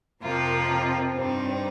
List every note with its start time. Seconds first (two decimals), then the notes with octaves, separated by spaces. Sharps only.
0.22 F2 C3 F3 A#3 F4 A#4
0.69 C4
1.15 G2 G3 C4 D#4